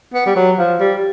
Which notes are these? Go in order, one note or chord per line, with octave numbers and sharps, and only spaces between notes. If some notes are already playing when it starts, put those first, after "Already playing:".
B3
G3
F#3
F3
G3